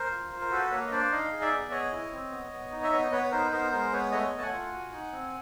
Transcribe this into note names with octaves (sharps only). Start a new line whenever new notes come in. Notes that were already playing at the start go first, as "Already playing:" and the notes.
Already playing: A#4 C5
F4
F4
A#4
F#4 A4 B4
A#3 B4 C#5
D#5
D4 C5 D5
D#4 D#5 F5
G#4
D5 E5
B3
G#4 C#5 D#5
E4
C4
B3
B3
D#4
E5
B3 C#5 D#5
B3 B4 C#5
C#5
D#4 A#4 C5
B4
B3 A#4 C5
G#3 A#4 C5
B3 B4 C#5
A3 C#5 D#5
A3
A5
F#5 G#5
F4
F#4
D#4
C4